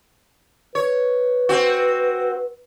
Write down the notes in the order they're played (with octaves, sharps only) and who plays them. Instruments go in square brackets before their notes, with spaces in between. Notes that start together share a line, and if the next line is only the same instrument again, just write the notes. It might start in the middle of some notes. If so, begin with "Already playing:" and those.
[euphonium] B4 [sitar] C#5
[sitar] C4 F#4